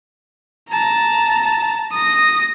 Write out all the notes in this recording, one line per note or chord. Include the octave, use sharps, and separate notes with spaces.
A5 A#5
D#6 A#6